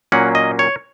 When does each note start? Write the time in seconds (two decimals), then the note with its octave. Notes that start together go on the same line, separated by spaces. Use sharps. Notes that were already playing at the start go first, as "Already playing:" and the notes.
0.12 A#2 F#3 A#3 C#4 F#5
0.35 D#5
0.59 C#5